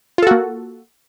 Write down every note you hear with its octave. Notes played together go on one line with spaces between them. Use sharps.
A#3 F4 F#4 A4